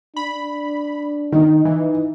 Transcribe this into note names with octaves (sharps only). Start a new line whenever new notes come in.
D4 B5
D#3 D#4
E3